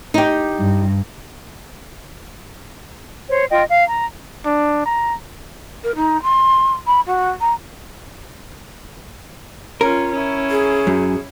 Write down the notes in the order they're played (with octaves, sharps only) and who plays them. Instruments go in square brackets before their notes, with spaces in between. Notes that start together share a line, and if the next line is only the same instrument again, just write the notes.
[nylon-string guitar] D#4 G4
[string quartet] G2
[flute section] C5 C#5
F4 D#5 G5
F5
A#5
[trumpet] D4
A#5
[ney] A#4
D#4
C6
B5
F#4
A#5
[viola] C#4 F4 [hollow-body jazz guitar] A#4
[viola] C#4 E4
[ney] G#4
[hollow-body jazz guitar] F#2